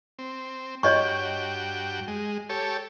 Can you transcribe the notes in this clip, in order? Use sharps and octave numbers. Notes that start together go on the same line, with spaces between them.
C4
G2 F#4 C#5 D#5 G5 C#6
G#3
G4 A4 C#5